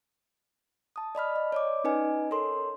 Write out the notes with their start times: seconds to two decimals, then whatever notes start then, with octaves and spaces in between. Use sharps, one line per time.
0.96 A5 D#6
1.15 D5 D#5 B5 F6
1.36 D#5
1.52 C#5 D5 D6
1.84 C#4 D#4 B4 D#5 G#5
2.31 A4 A#4 C#5 C6